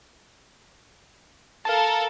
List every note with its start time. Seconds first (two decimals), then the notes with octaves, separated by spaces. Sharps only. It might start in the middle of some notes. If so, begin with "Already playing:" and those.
1.65 A4 A#4 F5 A5